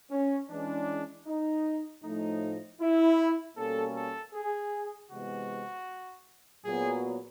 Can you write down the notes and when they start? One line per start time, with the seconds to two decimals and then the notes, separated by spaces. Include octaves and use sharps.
0.11 C#4
0.50 E3 G#3 C#4 D4
1.27 D#4
2.03 A2 F3 A3 D#4
2.81 E4
3.57 B2 G3 A#3 C#4 A4
3.95 A4
4.34 G#4
5.11 C3 E3 G#3 B3 F#4
6.65 A#2 F#3 B3 G#4